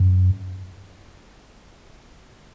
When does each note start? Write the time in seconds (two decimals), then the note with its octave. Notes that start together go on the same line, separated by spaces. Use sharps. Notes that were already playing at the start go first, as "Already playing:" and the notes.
Already playing: F#2